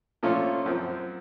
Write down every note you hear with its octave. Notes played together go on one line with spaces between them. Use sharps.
A#2 F3 A3 C#4 F4
F#2 F3 C4